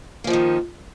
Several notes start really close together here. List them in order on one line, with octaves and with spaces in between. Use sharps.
A#3 F3 D#4 D#3